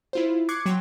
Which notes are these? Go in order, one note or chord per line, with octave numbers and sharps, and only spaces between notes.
E4 F4 C5
C#6 D6 F#6 G#6 C7 C#7
F#3 G5 C6 G#6 C7